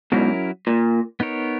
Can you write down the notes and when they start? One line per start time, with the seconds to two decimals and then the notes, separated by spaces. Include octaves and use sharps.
0.12 G#2 B2 F#3 C#4 E4 A#4
0.67 A#2
1.20 B3 D#4 A#4 C#5